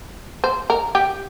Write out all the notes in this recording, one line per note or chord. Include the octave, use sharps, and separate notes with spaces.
C5
A#4
G4